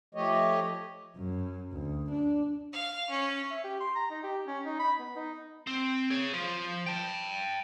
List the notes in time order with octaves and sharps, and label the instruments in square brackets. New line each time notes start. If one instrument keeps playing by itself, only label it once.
[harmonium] F3 A3 G4 C#5 D#5
[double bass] F#2
D2
D4
[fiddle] F5
C#4
[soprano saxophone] E5
G4
C6
A#5
D#4
G4
C#4
D#4
B5
B3
D#4
[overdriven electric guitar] C4
G#4 C#5
F3
G5 A5